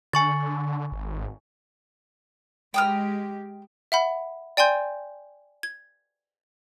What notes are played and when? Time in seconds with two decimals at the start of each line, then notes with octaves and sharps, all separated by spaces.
0.13 D3 G#5 C#6 A6
0.92 G#1
2.74 G#3 G4 G5 D#6 F6
3.92 E5 F#5 B5
4.57 D5 G5 G#5 C6 G6
5.63 G#6